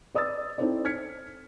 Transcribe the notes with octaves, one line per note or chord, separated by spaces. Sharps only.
B4 D5 D#6 E6 A6
C4 D#4 E4 A4 C5 D5
F6 G#6 B6 C#7